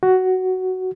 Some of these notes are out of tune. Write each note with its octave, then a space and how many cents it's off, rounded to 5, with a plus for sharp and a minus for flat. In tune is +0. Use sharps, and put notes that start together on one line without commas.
F#4 +10